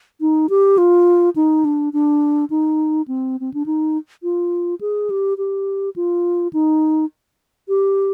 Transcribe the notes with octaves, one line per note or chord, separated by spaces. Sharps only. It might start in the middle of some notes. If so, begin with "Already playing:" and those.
D#4
G4
F4
D#4
D4
D4
D#4
C4
C4
D4
D#4
F4
G#4
G4
G4
F4
D#4
G4